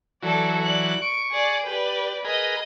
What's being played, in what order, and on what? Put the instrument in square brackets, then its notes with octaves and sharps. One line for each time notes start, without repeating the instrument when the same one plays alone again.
[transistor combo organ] E3 F#3 [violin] A4 D5
[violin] D5 F#6
[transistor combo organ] C#6 [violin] D7
[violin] G#4 D5
[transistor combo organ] G4 [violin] B4 D5
[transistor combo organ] G#4 A#4 B4 [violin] D#5